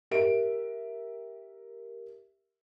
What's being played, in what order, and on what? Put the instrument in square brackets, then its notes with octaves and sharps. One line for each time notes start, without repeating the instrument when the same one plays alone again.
[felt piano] G4 A#4 E5 D7